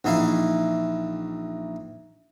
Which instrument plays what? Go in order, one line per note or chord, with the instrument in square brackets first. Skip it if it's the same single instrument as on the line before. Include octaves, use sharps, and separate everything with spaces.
[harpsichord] A#1 E3 D#4 E4 F5